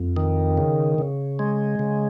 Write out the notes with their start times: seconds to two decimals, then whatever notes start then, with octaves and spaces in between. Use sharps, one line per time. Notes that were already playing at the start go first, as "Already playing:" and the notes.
Already playing: F2
0.17 D#3
0.57 C#3
0.98 C#3
1.39 G#3
1.79 C#3